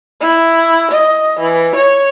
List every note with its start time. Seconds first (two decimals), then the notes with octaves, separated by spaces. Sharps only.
0.21 E4
0.92 D#5
1.40 E3
1.76 C#5